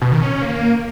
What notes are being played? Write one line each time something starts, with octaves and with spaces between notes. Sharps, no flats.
B2
D#3
C#4
C#4
A#3